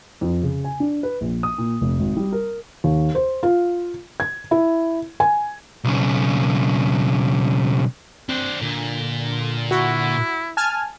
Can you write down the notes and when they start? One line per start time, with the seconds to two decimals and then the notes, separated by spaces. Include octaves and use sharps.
0.21 F2
0.43 C#3
0.64 G#5
0.80 D4
1.03 B4
1.21 A#1
1.43 D#6
1.58 A#2
1.82 F1
1.99 G#1
2.17 G3
2.33 A#4
2.84 D#2
3.15 C5
3.43 F4
4.20 G#6
4.51 E4
5.20 G#5
5.84 B1 C#3
8.29 C4 D4 C5
8.61 A#2 D3
9.71 E4 F#4
10.57 G#5 A5 F6